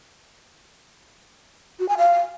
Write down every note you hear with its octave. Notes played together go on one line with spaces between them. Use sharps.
F#4
G#5
F5